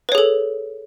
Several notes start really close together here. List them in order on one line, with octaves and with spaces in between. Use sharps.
B4 C#5 G#4 A4